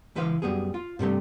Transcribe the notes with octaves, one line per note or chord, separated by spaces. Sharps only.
C#2 E3 E4 B4 C5 F5
F#2 G3 B3 G#4
F4
G2 C3 G3 A3